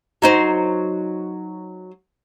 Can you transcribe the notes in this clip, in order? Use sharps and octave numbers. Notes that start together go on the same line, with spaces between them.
F#3 D#4 C5